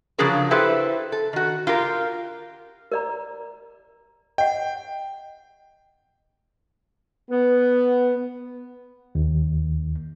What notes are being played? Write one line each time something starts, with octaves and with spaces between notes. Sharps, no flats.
C#3 F3 F#3 D4 G#4 A#4
E4 G4 A4 B4 C5
A4
D#3 F#4
F4 G4 A#4
A#4 D5 A#5
D#5 F#5 G5
B3
D#2